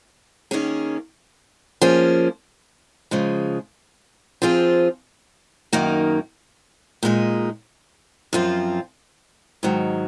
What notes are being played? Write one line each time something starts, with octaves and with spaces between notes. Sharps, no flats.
D#3 A#3 C#4 G#4
F3 A#3 C#4 G#4
C#3 F3 G#3
F3 C4 F4 G#4
F#2 D#3 A#3 D#4
A#2 G#3 D#4
F#2 F3 C4 F4
G#2 D#3 F#3